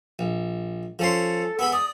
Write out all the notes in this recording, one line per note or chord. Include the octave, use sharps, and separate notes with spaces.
A#1
F3 C#4 A4 C6
B3 G#4 B5 E6
D5 D#6